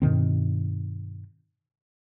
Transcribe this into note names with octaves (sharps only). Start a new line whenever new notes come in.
G2 B2 D#3 C4